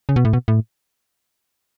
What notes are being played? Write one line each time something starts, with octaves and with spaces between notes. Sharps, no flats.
C#3
B2
A2
B2
A2